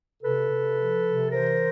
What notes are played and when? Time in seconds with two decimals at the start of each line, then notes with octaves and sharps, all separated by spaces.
0.22 C3 A4 B4
0.49 C3
0.77 F3
1.04 C3
1.30 E3 A#4 C5